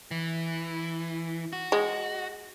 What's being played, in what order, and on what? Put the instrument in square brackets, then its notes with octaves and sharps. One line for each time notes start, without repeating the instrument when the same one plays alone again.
[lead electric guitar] E3
F#4
[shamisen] G#3